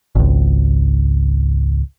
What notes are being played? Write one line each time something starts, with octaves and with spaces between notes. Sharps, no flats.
G#1 C#2